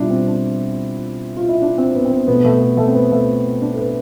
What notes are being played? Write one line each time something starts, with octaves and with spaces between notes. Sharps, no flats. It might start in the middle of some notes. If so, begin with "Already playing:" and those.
Already playing: B2 G3 D4 E4 F4
C4
D4
F4
E4
D4
C4
B3
C4
B3
B2 A3 B3
A3
B3
A3
C4
B3
A3
D4
A4
B4